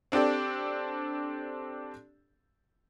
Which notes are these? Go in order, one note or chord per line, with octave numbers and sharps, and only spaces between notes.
C4 D4 G4 A4 D5